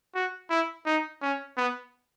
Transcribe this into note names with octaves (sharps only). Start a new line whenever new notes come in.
F#4
E4
D#4
C#4
B3